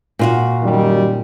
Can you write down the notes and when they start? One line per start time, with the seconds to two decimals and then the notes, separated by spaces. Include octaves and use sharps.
0.19 A#2 F4 F#4
0.62 F#2 D#3 G3